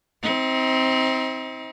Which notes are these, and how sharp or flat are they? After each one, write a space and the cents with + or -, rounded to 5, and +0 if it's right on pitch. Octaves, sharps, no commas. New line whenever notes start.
C4 +0 D#4 +40